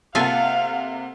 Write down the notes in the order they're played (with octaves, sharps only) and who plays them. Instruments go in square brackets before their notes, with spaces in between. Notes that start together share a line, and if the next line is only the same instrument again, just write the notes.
[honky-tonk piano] C3 A#3 F#5 [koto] F4 A4 G#5 [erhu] F5